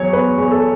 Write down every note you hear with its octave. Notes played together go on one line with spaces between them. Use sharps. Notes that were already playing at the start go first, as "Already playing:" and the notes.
Already playing: E2 F#3 C#5
E2 B4
E2
A4